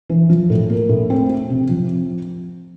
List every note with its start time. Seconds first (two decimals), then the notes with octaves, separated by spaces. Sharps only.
0.10 E3
0.29 F3
0.50 A2
0.70 A#3
0.89 A2
1.10 C4
1.29 C4
1.50 C3
1.69 F3